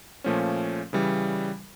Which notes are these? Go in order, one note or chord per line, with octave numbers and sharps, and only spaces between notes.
A#2 F3 A3 C#4
C#3 E3 G3